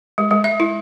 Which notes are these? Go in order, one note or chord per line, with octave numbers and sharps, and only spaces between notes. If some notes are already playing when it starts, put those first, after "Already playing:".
G#3
G#3
E5
E4